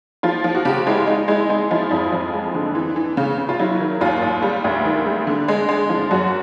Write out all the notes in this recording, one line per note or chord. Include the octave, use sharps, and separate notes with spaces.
F3 F4
F3
F#4
C#3 G4
G#3 E4
G#3 D#4
G#3 E4
G#3 D#4
F3 E4
F2 E4
F2
G#3
D3
E3
E3
C#3
C#3
F4
F#3 E4
D#3
D#2 F4
D#2
G3
D2
D#3
G3
D3
G#3
G#3
F3
F#2 F#4